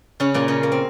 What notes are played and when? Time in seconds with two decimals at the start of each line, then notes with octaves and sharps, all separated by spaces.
0.20 C#3 C#4
0.34 A#2 A#3
0.48 C#3 C#4
0.63 A#3
0.72 C4